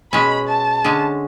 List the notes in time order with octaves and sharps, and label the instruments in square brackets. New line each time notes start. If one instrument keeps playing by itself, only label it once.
[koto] B2 G#3 C#4 [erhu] B5
[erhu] A5
[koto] D3 G#3 C#4